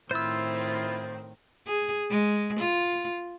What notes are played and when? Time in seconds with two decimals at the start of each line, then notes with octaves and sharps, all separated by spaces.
0.11 A2 D#3 C4 E4 F4 C5 E6
1.67 G#4
2.10 G#3
2.59 F4